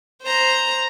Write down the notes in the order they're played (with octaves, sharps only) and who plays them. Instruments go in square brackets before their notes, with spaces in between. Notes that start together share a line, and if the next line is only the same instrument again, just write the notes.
[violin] C5 A#5